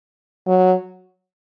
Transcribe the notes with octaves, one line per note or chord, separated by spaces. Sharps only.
F#3